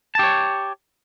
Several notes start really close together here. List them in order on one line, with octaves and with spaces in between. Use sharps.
A5 G4 C#5